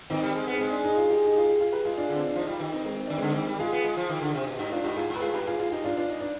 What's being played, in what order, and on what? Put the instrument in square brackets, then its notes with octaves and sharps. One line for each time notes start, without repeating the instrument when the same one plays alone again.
[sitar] D#3 [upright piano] C4 D#4
[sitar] G3
G#3
B3
[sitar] G#3 [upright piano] C4
[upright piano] D4
D#4
F4
D#4 G4
D#4
F4
G4
F4 G#4
G4 B4
[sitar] G#3 [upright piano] F4 G#4
[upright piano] D4 F4
[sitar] D3
[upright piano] C4
D4
[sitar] F3 [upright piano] D#4
[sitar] G3 [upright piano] F4
[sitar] D#3 [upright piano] D#4 G4
[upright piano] C4 D#4
G#3 C4
C4
[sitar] D#3 [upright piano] D4
[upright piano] G#3 C4
[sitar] D3
D#3
G3
[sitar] G#3 [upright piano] F4 G#4
[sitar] B3
G#3
F3
D#3
D3
C3
B2
[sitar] G#2 [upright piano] D#4 G4
[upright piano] D4 F4
[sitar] G#2 [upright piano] D#4 G4
[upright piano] F4 G#4
[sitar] G#2
[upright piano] B4
F4 G#4
[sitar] G2 [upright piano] G4 B4
[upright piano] F4 G#4
F4 G#4
D#4 G4
D4 F4
D4 F4
D#4
D4